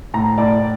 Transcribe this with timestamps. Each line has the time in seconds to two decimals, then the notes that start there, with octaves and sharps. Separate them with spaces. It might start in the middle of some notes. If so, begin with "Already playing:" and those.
0.14 A2 A#5
0.38 A2 D5